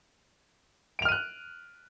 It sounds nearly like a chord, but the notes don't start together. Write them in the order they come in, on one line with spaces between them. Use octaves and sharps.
D7 F7 F6 D#7 F#6